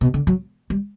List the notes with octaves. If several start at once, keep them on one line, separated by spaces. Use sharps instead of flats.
B2
D3
F#3
G3